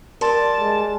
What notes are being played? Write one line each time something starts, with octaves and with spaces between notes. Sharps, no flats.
G3 A#4 A5 C6
G#3